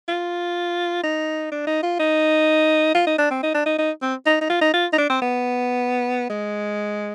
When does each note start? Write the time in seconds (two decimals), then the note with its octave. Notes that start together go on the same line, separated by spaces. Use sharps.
0.08 F4
1.04 D#4
1.52 D4
1.67 D#4
1.83 F4
2.00 D#4
2.95 F4
3.07 D#4
3.18 D4
3.31 C4
3.43 D#4
3.54 D4
3.66 D#4
3.78 D#4
4.02 C4
4.26 D#4
4.41 D#4
4.49 F4
4.61 D#4
4.74 F4
4.93 D#4
4.98 D4
5.10 C4
5.22 B3
6.29 G#3